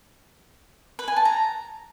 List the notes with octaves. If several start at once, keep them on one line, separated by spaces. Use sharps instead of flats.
B4
G#5
A5
A#5